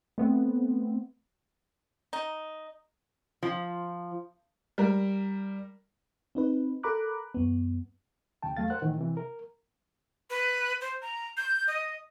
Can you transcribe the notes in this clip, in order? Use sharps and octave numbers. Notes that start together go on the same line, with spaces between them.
A3 B3 C4
D#4
F3
G3 A#4
C4 D#4 B4
A4 A#4 A#5 B5 D6 F#6
F#2 B3
D2 C#3 G5 A5
E2 F#3 A3 F5 A6
A#4 C5 F#5 F#6
A2 D#3 E3
C3 E3
A#4
B4
C5
A#5
G6
D#5